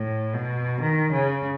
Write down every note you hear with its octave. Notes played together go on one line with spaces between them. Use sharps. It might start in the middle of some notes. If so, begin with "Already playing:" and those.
Already playing: A2
B2
D#3
C#3